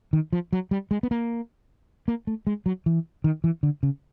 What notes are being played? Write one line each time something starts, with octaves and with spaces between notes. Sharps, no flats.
D#3
F3
F#3
G3
G#3
B3
A#3
A#3
A3
G#3
F#3
E3
D#3
E3
D3
C#3